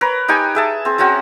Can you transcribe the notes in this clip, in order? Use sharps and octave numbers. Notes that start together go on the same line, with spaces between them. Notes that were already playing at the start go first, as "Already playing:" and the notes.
A#4 B4 C#5
D#4 G4 G5 G#5
G#4 E5 A5
C4 G#4
F#3 C4 C#4 F#4